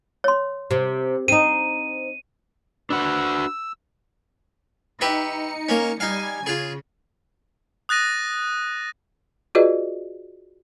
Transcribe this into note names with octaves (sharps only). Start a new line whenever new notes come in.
C#5 C6
C3
C4 D#4 D#7
D4 F#4 B4 F#5 E6
D#4 G4 B4 E5 C#7
A#3 C#4
G3 D#4 F5 G#5 G#6
C#3 F4 G#4
D#6 F#6 A6 A#6 D#7
F4 F#4 G#4 B4 D5 D#5